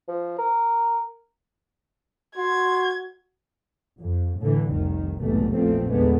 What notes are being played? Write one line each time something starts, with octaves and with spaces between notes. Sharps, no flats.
F3
A#4
F#4 C6 G#6
F2
A2 D3 E3
F1 C2 D#3
B1 E2 G#2 C3 A3
A#1 E2 A#2 F3 A3 C4
E2 D3 G#3 A3 B3